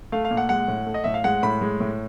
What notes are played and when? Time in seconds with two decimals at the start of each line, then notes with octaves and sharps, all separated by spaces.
0.12 A3 F5
0.25 F5
0.31 A#2
0.37 F#5
0.49 G#3 F#5
0.68 A2
0.86 A3
0.94 D#5
1.04 A2 E5
1.14 F5
1.24 G#3 F#5
1.43 A2 B5
1.61 G#3
1.80 A2